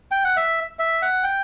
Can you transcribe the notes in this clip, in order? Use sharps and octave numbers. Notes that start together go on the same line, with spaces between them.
G5
F#5
E5
E5
F#5
G5